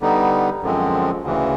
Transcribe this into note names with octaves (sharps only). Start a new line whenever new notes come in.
D3 G3 B3 D#4
F#2 D3 F3 G#3 C4
D2 C#3 E3